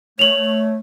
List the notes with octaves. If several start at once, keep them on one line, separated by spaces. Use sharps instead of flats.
A3 C#5 F7 F#7